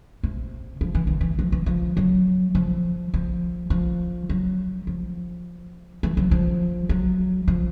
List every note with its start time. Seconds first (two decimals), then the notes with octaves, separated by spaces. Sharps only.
0.23 C3
0.81 F3
0.95 E3
1.07 D#3
1.21 E3
1.39 F3
1.52 E3
1.66 F3
1.97 F#3
2.55 F3
3.14 F3
3.70 F3
4.29 F#3
4.87 F3
6.03 E3
6.17 F#3
6.31 F3
6.89 F#3
7.48 F3